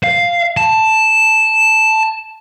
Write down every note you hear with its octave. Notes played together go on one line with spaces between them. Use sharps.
F5
A5